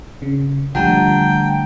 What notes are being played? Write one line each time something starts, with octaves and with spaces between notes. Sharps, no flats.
C#3
D3 F3 G3 A3 F#5 G5 A5 A#5